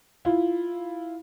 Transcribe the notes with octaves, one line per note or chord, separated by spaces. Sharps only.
E4 F4